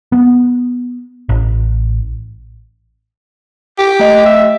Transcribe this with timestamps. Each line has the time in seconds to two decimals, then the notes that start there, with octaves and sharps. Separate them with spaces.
0.12 B3
1.29 A1
3.78 G4
3.99 A3 D#5
4.26 E5